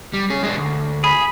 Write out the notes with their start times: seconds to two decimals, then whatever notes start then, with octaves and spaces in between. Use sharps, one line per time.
0.13 G3
0.30 C#4 G#4
0.43 G#3 D4
0.57 D2
1.04 G#4 B5